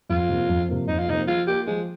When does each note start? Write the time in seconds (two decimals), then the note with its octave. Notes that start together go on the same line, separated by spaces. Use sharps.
0.09 F2 F4
0.29 C3 F3 A#3
0.49 F2
0.69 C3 F3 A#3
0.88 F2 D#4
0.99 F4
1.08 C3 F3 A#3 D#4
1.28 F3 F4
1.47 A#3 F4 G4
1.67 F3 G#3